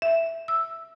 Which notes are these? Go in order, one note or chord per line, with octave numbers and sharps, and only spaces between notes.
E5
E6